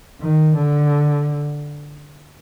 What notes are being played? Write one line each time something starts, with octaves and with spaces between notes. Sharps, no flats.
D#3
D3